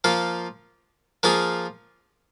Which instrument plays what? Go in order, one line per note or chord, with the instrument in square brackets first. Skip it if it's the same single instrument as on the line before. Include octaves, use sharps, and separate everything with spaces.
[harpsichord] F3 A#3 F4
F3 A#3 F4 G#4